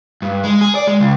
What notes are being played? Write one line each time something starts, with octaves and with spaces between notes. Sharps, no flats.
G2
G#3
G#4
D5
G#3
C#2